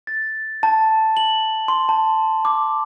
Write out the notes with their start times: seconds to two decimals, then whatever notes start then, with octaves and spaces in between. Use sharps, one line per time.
0.07 A6
0.63 A5
1.17 F#7
1.68 C6
1.89 A5
2.45 D6